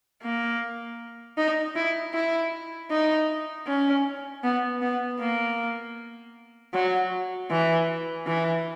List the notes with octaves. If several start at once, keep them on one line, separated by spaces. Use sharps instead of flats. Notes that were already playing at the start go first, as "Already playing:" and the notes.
A#3
D#4
E4
E4
D#4
C#4
B3
B3
A#3
F#3
E3
E3